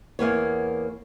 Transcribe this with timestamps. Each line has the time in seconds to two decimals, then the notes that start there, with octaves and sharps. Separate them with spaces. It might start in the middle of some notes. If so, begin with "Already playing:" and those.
0.19 E2 A#3 B3 C#5